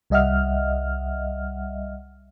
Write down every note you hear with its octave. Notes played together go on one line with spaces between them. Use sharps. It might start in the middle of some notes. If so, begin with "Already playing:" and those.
C2 G3 D#5 E5 F#5 F6